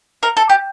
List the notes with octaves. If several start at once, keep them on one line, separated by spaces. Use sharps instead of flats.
A#4
A4
G4